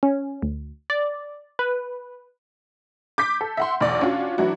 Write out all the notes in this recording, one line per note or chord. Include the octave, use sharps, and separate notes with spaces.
C#4
D2
D5
B4
D6 G6 B6
A4
E5 F#5 C6
B1 E2 D5
C#4 D4 F4 F#4
E3 F#3 D4 E4 F#4